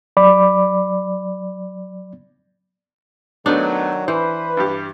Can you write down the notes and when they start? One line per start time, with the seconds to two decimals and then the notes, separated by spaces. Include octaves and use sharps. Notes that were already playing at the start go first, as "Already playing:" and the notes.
0.17 F#3 D5 B5 D6
3.46 D#3 F#3 A3 B3 D4 D#4
4.08 E3 B4 C5
4.57 G2 G3 G4